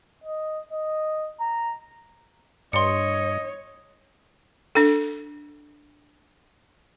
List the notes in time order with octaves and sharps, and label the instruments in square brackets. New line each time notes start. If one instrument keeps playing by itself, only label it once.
[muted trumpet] D#5
D#5
A#5
[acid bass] G2 [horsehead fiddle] C#5 [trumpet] D#5 [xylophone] C6 C#7
[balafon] D4 A4